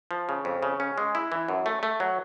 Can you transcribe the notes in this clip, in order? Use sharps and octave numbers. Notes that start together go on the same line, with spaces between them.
F3
C#3
F2
C#3
C#4
G#3
E4
E3
F#2
A3
A3
F#3